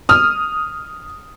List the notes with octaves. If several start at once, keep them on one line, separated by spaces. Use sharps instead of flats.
D#6 F6